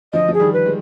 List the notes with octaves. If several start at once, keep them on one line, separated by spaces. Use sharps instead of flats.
D3 F3 D#5
F3 G#4
D#3 G3
B4
G#3